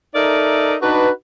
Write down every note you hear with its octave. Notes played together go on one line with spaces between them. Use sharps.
D#4 A4 A#4 D5 E5
D4 D#4 F#4 B4